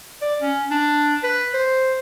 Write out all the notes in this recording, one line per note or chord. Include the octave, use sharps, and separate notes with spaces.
D5
C#4
D4
B4
C5